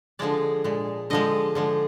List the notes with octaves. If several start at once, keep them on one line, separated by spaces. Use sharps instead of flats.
D3 F3 G#3 D5
A#2 G#3
D3 F3 G#3 D#5
D3 F3 G#3